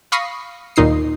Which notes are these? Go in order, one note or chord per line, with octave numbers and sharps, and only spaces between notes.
F5 B5 C#6 D#6 A#6 C7
D#2 A#2 D#4 D#6 C7